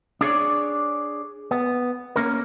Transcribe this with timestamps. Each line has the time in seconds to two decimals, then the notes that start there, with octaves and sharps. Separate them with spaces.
0.21 D4 G#4 C#5 D5
1.51 B3
2.16 A#3 C#4 A#4